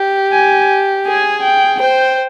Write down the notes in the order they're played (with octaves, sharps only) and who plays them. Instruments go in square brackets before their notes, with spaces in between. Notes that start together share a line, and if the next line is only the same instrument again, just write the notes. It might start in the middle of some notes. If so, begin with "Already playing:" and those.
Already playing: [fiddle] G4
[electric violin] G#5
[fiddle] G#4 [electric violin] G#5
[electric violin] G5
[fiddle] C5 [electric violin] G5